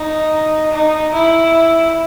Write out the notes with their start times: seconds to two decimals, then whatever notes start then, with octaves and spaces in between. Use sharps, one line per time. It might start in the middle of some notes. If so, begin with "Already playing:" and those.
Already playing: D#4
0.71 D#4
1.13 E4